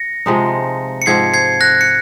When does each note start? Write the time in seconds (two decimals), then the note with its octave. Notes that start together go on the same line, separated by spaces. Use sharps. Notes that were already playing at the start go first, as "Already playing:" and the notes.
Already playing: A#6 C#7
0.26 C3 F3 G#3 D#4
1.02 C#7
1.06 G#2 F3 C4 G#6 C7
1.34 G#6 C7
1.61 F#6 A#6
1.81 C#7